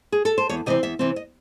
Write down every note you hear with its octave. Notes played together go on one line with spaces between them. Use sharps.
G#4
A4
C5
E2 C#5
C3 E3 C4 D#5
E2 E5
C3 E3 C4
D#5